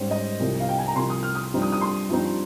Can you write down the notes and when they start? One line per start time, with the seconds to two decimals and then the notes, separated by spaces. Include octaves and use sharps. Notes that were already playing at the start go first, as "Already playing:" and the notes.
Already playing: G#2 G3 C#4 C5
0.11 D#5
0.40 C2 C3 F3
0.60 F5
0.68 G5
0.78 G#5
0.87 A#5
0.96 C2 C3 F3 C6
1.10 D#6
1.23 F6
1.35 D#6
1.54 G2 F3 C4 D#4
1.62 D#6
1.72 D#6
1.81 C6
2.09 G2 F3 C4 D#4